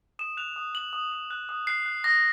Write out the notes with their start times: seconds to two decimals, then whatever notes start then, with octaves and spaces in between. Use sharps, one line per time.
0.19 D#6 E7
0.37 F#6 F7
0.56 D#6
0.74 F#6 F#7
0.93 D#6
1.12 D#6
1.30 F#6
1.49 D#6
1.67 F#6 C7
1.86 F#6
2.04 D#6 A#6